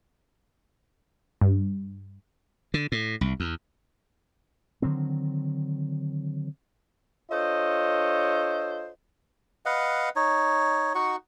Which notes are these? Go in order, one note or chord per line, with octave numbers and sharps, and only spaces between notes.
G2
D3
A2
C2
E2
D3 D#3 F#3 C4
D4 F4 A4 C5 C#5 D#5
B4 D#5 F5 F#5
D#4 C#5
D#4 F#4 F#5 C#6